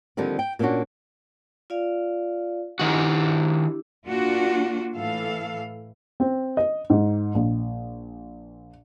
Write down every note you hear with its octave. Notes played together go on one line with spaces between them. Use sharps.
D3 D#3 F3 G3 A#3 C4
G5
A#2 A#3 B3 C#4 D4 F#4
F4 D5 F5
D#3 D4 E4 F#4 G4
A#3 D4 F4 F#4
A2 E3 A4 F5
C4
D#5
G#2
A#1